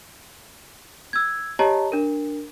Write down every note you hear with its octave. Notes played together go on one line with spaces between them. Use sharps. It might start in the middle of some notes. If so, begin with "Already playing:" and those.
E6 G#6
G4 C#5 D#5 A5 A#5
D4 A#4